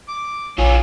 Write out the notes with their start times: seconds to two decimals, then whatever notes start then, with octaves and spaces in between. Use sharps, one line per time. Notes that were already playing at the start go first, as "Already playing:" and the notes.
0.08 D6
0.58 A#1 F4 G#4 C#5